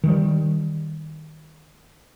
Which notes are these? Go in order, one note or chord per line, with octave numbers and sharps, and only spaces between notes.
D#3 G3